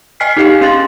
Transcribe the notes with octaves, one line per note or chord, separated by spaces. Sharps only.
D#5 G5 G#5 F6 B6 C7
D#4 G4 G#4 D#5 F5 G5
C#4 F5 C6 A6 F#7